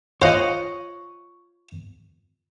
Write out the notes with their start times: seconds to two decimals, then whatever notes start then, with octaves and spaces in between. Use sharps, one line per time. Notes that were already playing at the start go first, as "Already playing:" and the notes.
0.22 F4 C5 C#5 D#5 F5 F#5